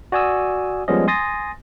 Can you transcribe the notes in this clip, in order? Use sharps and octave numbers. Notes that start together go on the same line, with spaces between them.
F#4 D5 G#5 D#6 E6
F3 G3 G#3 B3 C#4 D#5
G#5 C6 D#6 A6 A#6